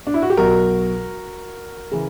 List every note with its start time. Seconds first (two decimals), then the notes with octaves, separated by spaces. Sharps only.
0.07 D4
0.14 E4
0.22 F#4
0.30 G4
0.37 B1 B2 F#4 A#4
1.91 C#3 E3